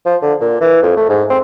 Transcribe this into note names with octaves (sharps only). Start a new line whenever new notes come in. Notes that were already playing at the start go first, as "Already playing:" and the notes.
F3
D3
A#2
E3
F2
A3
G#2
C4